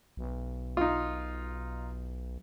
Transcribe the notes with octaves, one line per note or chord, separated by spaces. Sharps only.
B1
D#4 F4